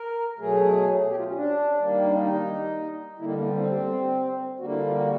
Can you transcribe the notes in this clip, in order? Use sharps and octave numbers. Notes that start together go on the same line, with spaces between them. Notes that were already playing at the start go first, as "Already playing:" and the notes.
Already playing: A#4
B2 F#3 A3 G#4
G4
F4
C#4
D4
D#3 G3 A#3
D4
D#4
D3 G3 A#3 E4
D#4
A#3
B3
C4
D3 G3 A#3 F#4
E4
F4
F#4